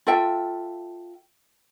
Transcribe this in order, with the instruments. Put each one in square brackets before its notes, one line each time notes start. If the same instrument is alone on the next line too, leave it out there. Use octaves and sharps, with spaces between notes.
[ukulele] F4 A4 E5 G5